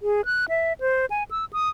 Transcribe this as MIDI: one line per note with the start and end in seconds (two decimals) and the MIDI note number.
0.02 0.25 68
0.25 0.45 90
0.49 0.73 76
0.80 1.06 72
1.10 1.23 80
1.31 1.45 88
1.53 1.69 87